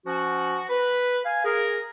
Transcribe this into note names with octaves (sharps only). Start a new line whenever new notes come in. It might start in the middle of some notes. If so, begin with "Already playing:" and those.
F3 C#4 F#4
B4
F5 G#5
G#4 A#4